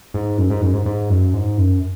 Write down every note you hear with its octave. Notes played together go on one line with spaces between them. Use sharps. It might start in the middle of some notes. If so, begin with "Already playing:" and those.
G#2
F#2
G#2
F#2
G#2
G#2
F#2
G#2
F#2